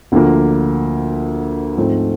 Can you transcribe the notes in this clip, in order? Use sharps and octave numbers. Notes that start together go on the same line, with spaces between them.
D2 D3 F3 A#3
G#2 F3 A3 C4